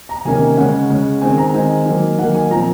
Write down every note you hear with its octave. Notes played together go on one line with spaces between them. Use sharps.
A#5
C3 D#3 A#3 C#4 G#5
C#3 G#3 C#4 F#5
C#3 G#3 C#4
D#3 G#3 C4 G#5
A#5
D#3 G#3 C4 G#5
D#3 F#3 A#3
D#3 F#3 A#3 F#5
G#5
A#2 F3 C4 A#5